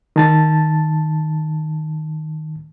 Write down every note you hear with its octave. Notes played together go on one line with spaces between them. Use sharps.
D#3 A5 A6